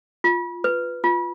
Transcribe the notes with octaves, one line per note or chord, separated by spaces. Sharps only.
F4
B4
F4